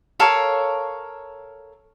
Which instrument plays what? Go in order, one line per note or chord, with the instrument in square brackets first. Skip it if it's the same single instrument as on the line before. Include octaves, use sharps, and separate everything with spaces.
[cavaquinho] A4 A#4 C#5 F5